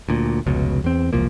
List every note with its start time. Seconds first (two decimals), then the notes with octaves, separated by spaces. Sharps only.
0.09 D2 A#2
0.46 F1 C#2 B2
0.84 E2 C4
1.13 E1 C2 F3 A#3